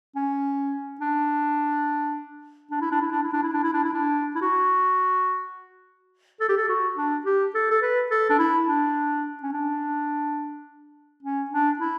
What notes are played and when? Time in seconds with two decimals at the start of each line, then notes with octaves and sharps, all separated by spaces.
0.16 C#4
1.01 D4
2.71 D4
2.81 E4
2.92 D4
3.02 E4
3.12 D4
3.23 E4
3.33 D4
3.43 E4
3.54 D4
3.63 E4
3.74 D4
3.84 E4
3.94 D4
4.35 E4
4.42 F#4
6.40 A4
6.49 G4
6.57 A4
6.69 F#4
6.97 D4
7.25 G4
7.54 A4
7.71 A4
7.82 B4
8.11 A4
8.30 D4
8.39 E4
8.67 D4
9.43 C#4
9.53 D4
11.23 C#4
11.51 D4
11.79 E4